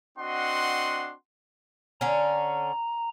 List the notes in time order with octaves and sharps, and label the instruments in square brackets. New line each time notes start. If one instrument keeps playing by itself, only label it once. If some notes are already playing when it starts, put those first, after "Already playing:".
[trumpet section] C4 D4 F#4 D#5 F#5 C6
[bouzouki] D3 C#4 [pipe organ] A#5